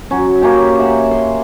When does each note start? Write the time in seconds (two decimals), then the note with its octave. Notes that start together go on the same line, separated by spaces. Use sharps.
0.11 F#3 C#4
0.41 A#3 C#4 G4
0.79 E5 F#5 A#5
1.11 C6